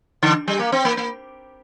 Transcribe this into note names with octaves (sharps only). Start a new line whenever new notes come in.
D3
G3
A#3
C4
A#3
A#3